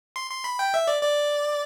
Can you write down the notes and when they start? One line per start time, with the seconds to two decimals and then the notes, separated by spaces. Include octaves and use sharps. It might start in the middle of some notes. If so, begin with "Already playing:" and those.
0.16 C6
0.31 C6
0.44 B5
0.59 G5
0.74 E5
0.88 D5
1.01 D5